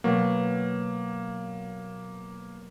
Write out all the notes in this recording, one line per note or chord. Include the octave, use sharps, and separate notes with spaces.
B2 F#3 A#3